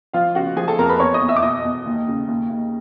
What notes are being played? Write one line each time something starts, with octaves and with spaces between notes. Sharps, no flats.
F3 F4 F5
C#3 F#4 F#5
F3 G#4 G#5
A4 A5
F2 A#4 A#5
B4 B5
E2 C#5 C#6
D#5 D#6
E2
E5 E6
D6
B2 D#5 D#6
E2
D#2
C#3
D#2
D#2